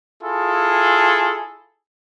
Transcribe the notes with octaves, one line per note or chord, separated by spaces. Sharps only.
E4 F4 G#4 A4